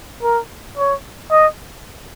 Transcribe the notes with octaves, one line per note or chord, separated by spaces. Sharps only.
A#4
C#5
D#5